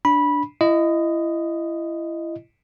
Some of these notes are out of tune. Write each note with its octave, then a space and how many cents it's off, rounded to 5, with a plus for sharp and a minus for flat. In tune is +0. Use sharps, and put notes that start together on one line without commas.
D4 +0 B5 -15
E4 +30 D#5 -5